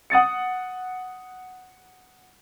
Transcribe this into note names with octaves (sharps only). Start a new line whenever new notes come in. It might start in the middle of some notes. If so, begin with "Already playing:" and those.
F#5 D#6 A6 C#7